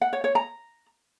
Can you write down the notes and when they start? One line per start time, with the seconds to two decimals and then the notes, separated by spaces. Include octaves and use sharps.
0.01 F#5
0.13 C#5
0.24 C#5
0.35 A#5